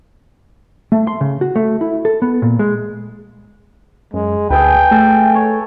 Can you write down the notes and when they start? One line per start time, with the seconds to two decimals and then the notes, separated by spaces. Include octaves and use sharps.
0.92 A3
1.07 C6
1.21 C#3
1.41 F#4
1.56 A3
1.81 E4
2.05 A4
2.22 B3
2.42 A#2
2.59 G#3
4.14 F#2 G#3
4.50 D2 G#4 A4 B4 G5
4.91 A3 A4 G#5
5.35 C#5